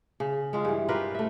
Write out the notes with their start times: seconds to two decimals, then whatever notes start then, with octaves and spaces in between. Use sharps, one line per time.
0.20 C#3
0.53 G#3 C#4 F4
0.65 G2 E3
0.88 F4 G4 A#4 B4
1.14 A3 E5